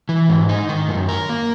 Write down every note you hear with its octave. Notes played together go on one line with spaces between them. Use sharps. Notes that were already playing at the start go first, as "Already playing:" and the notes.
E3
G#2
D#4
D#3
F#2
A#4
A#3